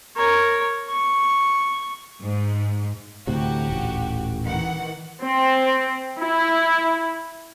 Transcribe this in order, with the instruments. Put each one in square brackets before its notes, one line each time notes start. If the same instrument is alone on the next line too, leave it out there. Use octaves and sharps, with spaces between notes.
[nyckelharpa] A#4 C#5
C#6
[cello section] G#2
[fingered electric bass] D2 A2 C3 [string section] F#4 G4
[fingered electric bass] D#1 A1
[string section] D#3 E3 F#5
[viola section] C4
E4